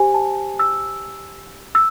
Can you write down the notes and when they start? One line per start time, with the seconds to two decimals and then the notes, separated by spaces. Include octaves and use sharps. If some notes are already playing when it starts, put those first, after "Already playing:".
Already playing: G4 C5 G#5
0.14 A5
0.59 E6
1.75 E6